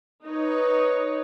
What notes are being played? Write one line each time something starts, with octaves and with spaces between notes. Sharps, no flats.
D#4 B4 C#5